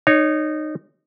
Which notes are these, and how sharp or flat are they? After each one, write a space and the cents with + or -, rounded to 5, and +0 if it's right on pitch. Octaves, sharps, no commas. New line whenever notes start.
D#4 -20 C#5 +0